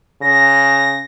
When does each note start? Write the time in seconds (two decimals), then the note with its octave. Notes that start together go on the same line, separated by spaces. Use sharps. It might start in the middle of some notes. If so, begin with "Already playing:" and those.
0.21 C#3 A#6